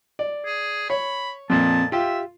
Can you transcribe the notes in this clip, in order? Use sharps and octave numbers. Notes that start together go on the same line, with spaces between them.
D5
G#4
C#5 B5
F2 A#2 C4 A5
F4 G4 E5 G5